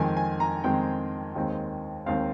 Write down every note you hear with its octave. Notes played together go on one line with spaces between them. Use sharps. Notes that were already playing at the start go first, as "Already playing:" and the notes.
Already playing: F2 D#3 G#3 C4 G#5
G#5
A#5
F2 D#3 G#3 C4 G5
D#2 D#3 G#3 C4
D#2 D#3 G#3 C4 F5